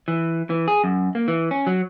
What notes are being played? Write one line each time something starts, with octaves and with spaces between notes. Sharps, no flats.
E3
E3
G#4
F#2
A#3
E3
C#4
F#3